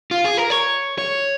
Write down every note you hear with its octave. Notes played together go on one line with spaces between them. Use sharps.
F4
G#4
A#4
C#5
C#5